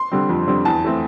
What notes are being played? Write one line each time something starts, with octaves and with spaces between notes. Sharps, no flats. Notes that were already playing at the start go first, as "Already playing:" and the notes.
Already playing: C6
D3 G3 C4
F2
D3 G3 C4
E2 A5
E3 A3 C4